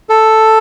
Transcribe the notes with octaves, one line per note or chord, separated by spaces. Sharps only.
A4